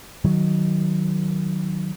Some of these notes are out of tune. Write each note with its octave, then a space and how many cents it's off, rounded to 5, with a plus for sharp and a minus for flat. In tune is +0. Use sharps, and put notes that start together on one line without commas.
D#3 +0 F#3 +0